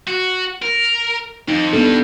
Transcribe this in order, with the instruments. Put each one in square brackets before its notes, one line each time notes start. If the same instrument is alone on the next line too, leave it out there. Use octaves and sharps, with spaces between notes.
[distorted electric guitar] F#4
A#4
[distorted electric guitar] F2 [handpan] D#4
[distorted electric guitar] G2 G3 [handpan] B3 D4 A4